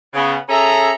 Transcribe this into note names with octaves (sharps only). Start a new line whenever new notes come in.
C#3 B3
C#4 G#4 A4 E5 A#5